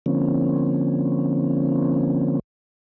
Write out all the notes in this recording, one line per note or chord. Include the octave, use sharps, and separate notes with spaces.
D3 F3 A#3 C4 C#4